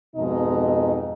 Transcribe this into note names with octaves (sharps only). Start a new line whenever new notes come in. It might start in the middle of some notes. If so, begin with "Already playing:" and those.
F2 G#2 B2 D#4 D#5